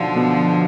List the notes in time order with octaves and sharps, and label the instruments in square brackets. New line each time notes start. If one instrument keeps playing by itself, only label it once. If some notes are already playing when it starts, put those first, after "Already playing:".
Already playing: [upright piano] B1 [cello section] D3 F3
[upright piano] B2 B3